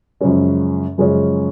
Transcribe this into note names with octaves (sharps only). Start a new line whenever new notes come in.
F#2 C#3 F3 G#3 C#4
F#2 C#3 F3 G#3 C#4